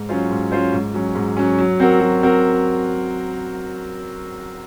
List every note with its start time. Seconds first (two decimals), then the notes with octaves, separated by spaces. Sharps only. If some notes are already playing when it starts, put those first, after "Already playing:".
Already playing: G#2
0.09 F#3 C#4 F4 C5
0.30 G#2
0.52 F#3 C#4 F4 C5
0.73 G#2
0.94 F#3 C#4
1.15 G#2
1.37 F#3 C#4
1.58 F#3
1.80 C4 F#4 A#4
2.01 F#3
2.23 C4 F#4 A#4